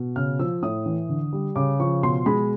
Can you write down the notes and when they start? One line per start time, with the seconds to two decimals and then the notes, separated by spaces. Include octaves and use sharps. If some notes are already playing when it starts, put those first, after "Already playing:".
Already playing: B2
0.16 C#3 F6
0.39 F3 E6
0.63 A2 D#6
0.86 E3
1.09 D3
1.33 G3
1.56 C#3 D6
1.80 F3 C#6
2.03 B2 C6
2.26 G#3 B5